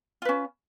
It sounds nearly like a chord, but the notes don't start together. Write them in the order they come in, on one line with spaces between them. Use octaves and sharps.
F4 B4 C#4